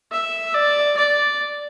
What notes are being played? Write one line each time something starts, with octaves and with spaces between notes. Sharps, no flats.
E5
D5
D5